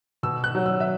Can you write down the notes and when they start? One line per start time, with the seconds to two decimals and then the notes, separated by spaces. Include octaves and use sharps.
0.23 B2 E6
0.44 F#6
0.55 F#3
0.66 E6
0.80 E5